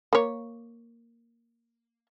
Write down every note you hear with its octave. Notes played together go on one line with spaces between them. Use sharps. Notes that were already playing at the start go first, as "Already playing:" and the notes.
A#3 C#5